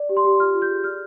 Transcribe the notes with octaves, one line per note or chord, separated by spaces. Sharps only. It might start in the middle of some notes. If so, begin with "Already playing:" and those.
Already playing: D5
G4
C6
G4
F4 F6
F4
G6
G#4
D5 F6